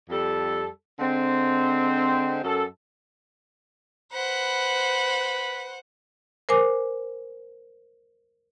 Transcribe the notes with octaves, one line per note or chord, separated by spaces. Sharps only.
F2 G3 A4
D3 G#3 C4
F#2 A4
B4 C5 F#5 B5
A#4 C5 G#5 D6